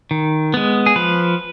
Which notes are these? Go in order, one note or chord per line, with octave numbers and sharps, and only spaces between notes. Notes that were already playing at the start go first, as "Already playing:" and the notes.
D#3
G#3 B3
G#4
F3 B4